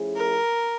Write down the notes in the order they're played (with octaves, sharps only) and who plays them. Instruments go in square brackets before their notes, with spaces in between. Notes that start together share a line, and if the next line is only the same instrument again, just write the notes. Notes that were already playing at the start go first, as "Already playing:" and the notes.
Already playing: [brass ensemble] F3 A3 C#4 E4 G#4
[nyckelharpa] A#4